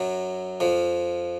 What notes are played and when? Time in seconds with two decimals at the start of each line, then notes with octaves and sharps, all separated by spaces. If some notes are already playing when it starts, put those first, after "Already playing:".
Already playing: F#2 F#3
0.60 F2 F3